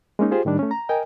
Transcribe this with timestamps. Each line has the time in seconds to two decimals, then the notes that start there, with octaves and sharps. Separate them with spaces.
0.19 G#3 A#3 C#4 D#4
0.31 F4 G4 G#4 C5
0.45 A2 D#3 G3 D4
0.59 A3 C#4
0.71 A#5
0.89 A#4 D#5 G5 G#5